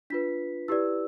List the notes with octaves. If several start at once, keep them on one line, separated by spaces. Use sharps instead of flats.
D4 F4 B4 B6
E4 G4 B4 D5 E6